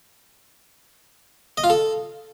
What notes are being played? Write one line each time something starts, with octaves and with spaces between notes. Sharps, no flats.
D#5
F4
A4